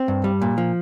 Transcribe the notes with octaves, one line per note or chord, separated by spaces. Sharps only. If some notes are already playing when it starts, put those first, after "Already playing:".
Already playing: C4
G2
G3
A#2
F3